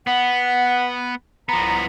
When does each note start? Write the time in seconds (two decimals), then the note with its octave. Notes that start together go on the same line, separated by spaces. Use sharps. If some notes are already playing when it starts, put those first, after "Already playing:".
0.07 B3 F#5
1.49 C2 F3 B3 A#5